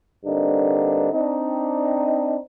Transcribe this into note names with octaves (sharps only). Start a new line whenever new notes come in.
G2 D3 A#3 C4 D4 D#4
C4 D4 D#4